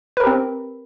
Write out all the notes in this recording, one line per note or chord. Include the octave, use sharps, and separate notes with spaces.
C4 G4 A#4 B4